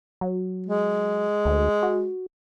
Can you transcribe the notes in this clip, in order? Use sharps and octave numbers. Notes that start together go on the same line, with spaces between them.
F#3
G#3
D2
F#4